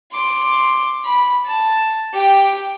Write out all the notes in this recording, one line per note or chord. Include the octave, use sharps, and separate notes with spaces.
C6 D6
B5
A5
G4 G5